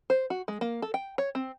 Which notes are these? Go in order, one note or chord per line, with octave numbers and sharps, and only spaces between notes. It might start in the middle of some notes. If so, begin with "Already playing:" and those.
C5
F#4
G#3
A#3
A4
G5
C#5
C4